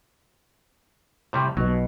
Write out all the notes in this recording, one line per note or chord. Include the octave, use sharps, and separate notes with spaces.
A2 C3 G3
B1 B2 F#3